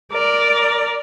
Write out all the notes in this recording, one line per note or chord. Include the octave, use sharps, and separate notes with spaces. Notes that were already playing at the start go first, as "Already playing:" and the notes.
A#4 D5